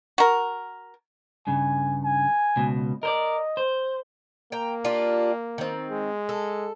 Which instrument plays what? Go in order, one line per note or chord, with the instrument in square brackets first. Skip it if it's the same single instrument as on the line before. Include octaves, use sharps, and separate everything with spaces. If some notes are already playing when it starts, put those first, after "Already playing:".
[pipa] F#4 A#4
[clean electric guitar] G2 C#3 [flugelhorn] G#5
[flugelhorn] G#5
[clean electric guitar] C#2 B2
[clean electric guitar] A#4 C5 D5 [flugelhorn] D#5
[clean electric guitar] C5
[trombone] A#3 [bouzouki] G5 A#5
[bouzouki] D4 F4 G4
D#3 C4
[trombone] G#3
[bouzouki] A4